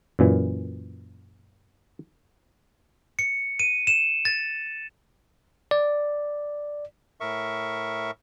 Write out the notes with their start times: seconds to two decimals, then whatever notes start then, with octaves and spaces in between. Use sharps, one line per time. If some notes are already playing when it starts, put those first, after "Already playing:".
0.19 F#2 A#2 E3
3.19 C#7
3.59 D#7
3.87 E7
4.25 A6
5.71 D5
7.20 A2 A#4 E5 C#6